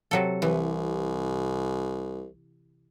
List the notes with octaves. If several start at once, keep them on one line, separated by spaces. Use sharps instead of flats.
C3 F#3 A4
C2 E3